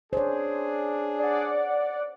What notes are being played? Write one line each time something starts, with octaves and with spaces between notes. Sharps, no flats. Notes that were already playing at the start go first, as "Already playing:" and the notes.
D4 G#4 C5 C#5
D5 F#5